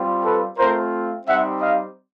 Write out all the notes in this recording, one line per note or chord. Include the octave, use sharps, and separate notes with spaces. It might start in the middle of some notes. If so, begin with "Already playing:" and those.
Already playing: G3 C4 F4
A4 B4
A3 C4 F4 A#4 C5
G3 C4 D#4 G4 E5 F#5
D#5 F5